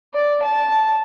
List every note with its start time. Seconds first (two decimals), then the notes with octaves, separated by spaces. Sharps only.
0.14 D5
0.42 A5